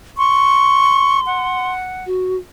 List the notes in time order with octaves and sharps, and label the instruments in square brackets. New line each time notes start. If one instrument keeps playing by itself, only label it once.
[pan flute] C6 [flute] C#6
[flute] F#5
[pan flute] F#4